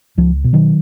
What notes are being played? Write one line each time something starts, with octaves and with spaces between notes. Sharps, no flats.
C#2 F3
B2
D#3 F#3